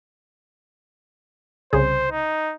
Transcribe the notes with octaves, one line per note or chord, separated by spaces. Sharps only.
C2 C#3 G#4 C5
D#4